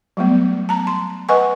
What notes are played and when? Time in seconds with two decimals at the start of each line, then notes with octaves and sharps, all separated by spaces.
0.17 F#3 G3 A3 B3
0.69 A5 A#5
0.87 C6
1.29 B4 D#5 F#5 G#5 C#6